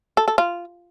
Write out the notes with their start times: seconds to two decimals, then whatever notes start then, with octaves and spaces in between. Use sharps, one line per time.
0.17 A4
0.28 A4
0.38 F4